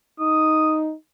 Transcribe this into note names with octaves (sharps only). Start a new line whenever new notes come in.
D#4 D#6